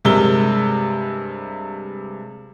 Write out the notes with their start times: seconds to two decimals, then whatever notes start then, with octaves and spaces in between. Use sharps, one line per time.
0.05 G2 C3 G#3 A#4 G7